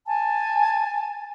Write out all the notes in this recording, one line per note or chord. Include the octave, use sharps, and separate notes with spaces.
G#5 A5